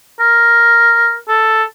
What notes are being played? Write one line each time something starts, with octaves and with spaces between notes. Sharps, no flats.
A#4
A4